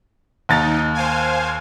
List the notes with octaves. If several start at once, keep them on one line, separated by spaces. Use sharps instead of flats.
D#2 D#4 A#5 A6
C5 F5 G#5